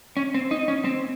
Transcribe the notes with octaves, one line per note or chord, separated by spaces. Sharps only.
C#4
C4
D#4
C#4
C4